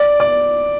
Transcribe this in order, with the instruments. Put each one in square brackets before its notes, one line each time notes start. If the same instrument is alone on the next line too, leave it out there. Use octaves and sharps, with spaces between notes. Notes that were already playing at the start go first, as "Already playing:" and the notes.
Already playing: [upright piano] D5
D5